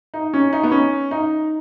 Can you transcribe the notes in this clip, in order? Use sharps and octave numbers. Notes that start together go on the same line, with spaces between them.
D#4
C#4
D#4
B3
C#4
D#4